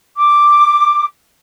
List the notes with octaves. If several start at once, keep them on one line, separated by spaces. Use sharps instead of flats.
D6